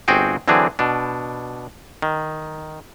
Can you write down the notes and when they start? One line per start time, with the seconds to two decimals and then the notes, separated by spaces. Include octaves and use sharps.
0.08 G1 C4 F#4 G#4 G5
0.48 D3 E3 F#3 C4 D4 G#4
0.79 B2 D4
2.02 D#3